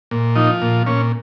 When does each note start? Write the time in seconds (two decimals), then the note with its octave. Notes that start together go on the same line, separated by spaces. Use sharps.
0.11 A#2
0.36 F3 D#4
0.62 A#2
0.86 A#2 C#4